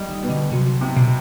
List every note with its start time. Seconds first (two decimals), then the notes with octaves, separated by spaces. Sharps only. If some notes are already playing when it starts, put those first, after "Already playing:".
Already playing: G3 D#4
0.08 D#3
0.23 B2
0.30 D3
0.52 C3 F#3
0.81 C3
0.97 B2